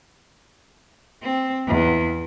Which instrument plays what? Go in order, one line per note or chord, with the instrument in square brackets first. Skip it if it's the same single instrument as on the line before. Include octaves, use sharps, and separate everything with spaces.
[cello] C4
E2